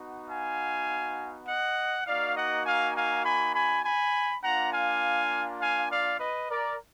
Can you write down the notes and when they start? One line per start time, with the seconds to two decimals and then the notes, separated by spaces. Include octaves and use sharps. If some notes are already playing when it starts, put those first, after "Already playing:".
Already playing: B3 D#4 F#4
0.29 F5 G#5
1.47 D#5 F#5
2.06 A#3 D#4 F#4 D5 F5
2.36 D#5 F#5
2.65 F5 G#5
2.95 F5 G#5
3.25 G#5 B5
3.54 G#5 B5
3.84 G#5 B5
4.43 A#3 D4 F4 F#5 A#5
4.72 F5 G#5
5.61 F5 G#5
5.90 D5 F5
6.20 B4 D#5
6.49 A#4 D5